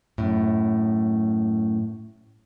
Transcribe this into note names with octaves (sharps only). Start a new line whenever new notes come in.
F#2 A2